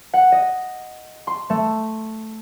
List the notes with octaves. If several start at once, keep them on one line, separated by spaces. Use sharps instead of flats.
F#5
D#5
C6
A3